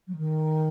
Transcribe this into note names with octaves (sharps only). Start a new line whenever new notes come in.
F#3
D#3